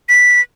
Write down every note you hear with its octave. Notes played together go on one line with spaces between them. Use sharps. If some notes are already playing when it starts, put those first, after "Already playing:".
B6